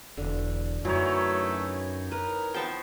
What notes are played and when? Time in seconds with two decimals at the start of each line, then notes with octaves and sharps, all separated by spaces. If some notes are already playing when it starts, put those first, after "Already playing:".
0.17 E1 D3
0.85 F#2 E3 F#3 A3 D#4 C#5
2.12 A#4 B4
2.54 F3 B3 G5 A5 C#6